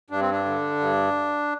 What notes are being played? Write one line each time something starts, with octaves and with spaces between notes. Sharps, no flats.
G2 D4
C4
D4
D3
G2